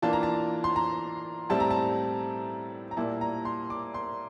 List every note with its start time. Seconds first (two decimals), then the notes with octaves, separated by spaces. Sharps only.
0.02 E3 A#3 D4 F4 A5
0.13 A#5
0.23 A5
0.64 C6
0.76 A#5
1.49 A2 G3 C4 E4 A5
1.60 A#5
1.71 A5
2.91 A#5
2.97 A#2 G3 A#3 E4 A5
3.21 A#5
3.45 C6
3.70 D6
3.94 C6